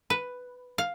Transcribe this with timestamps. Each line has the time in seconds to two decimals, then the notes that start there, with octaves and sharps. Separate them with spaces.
0.10 B4
0.78 F5